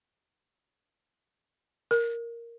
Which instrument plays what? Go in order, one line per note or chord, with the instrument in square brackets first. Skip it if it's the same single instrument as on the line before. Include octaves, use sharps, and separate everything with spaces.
[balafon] A#4